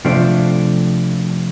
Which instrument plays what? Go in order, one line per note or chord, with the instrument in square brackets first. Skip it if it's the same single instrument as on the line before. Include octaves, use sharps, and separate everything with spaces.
[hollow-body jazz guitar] C3 F3 A3 D4